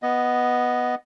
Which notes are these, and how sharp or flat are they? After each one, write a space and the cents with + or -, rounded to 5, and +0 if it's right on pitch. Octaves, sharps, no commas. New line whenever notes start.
B3 +0 D#5 +0